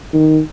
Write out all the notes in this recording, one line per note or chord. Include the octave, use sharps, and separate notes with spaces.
D#3